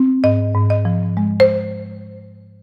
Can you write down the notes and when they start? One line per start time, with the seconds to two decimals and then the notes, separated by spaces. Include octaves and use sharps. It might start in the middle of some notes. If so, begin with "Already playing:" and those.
Already playing: C4
0.24 G#2 D#5
0.55 G#2
0.70 D#5
0.85 F3
1.17 G#3
1.40 C5